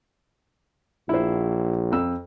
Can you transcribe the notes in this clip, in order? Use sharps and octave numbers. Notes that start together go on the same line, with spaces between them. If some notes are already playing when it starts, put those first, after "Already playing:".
A#1 E4 C5
F2 E6